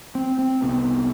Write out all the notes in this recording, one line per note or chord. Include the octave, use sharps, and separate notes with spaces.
C4
C4
C2 C3 B3